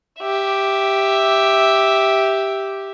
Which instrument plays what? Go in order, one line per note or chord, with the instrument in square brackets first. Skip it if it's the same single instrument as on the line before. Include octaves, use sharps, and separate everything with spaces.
[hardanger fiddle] G4 E5